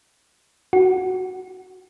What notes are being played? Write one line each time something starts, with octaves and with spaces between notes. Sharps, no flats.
F#4